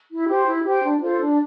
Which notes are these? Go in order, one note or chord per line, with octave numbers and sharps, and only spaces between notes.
E4
G4 C5 G5
E4
G4 C5 G5
D4
F4 A4 C5
D4